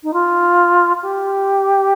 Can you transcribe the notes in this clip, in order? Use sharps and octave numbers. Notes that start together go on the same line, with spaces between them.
D#4
F4
G4